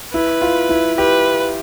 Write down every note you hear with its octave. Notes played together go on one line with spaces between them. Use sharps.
E4 B4
F4
E4
G4 B4